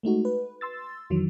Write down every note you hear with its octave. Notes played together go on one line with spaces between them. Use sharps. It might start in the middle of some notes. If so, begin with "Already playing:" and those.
G#3 A3 D#4 F#4
B4
C6 E6 A6
F2 D#3 E3 F#3